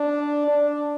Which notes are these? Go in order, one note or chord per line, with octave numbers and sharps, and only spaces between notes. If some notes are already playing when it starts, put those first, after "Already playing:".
Already playing: D4
D4